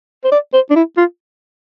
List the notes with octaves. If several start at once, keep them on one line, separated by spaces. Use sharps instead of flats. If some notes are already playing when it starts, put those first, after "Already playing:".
C5
D5
C5
D4
E4
F4